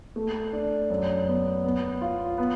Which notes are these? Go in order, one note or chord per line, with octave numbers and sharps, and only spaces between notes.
A3
D4
F#2
B3
B3
F4
B3